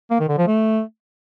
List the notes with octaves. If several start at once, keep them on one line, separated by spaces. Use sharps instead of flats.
A#3
D#3
D3
F3
A3